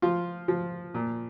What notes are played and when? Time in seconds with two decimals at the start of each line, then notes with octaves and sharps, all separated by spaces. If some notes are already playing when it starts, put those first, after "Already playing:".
0.02 F3 F4
0.48 F3
0.94 A#2